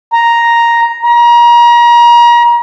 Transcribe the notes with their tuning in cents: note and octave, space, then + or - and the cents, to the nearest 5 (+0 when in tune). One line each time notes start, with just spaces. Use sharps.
A#5 +5
A#5 +35